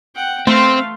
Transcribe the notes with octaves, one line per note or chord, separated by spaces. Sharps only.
F#5 G5
A3 C4 F5 C6